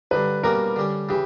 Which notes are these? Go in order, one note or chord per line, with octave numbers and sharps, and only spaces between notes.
G2 D3 F#3 B4
B2 G3 A#3 C#4 F#4 A#4
D3 G3 C#4
C#3 E3 G4